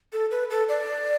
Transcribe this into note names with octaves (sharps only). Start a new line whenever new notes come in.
A4
B4
A4
D5